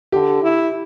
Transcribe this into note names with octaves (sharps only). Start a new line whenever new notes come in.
D3 G4
E4